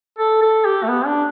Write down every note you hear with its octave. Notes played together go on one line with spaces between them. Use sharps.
A4
A4
G4
A3
B3
D4